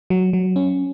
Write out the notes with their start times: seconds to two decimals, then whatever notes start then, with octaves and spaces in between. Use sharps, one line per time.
0.10 F#3
0.33 F#3
0.56 C#4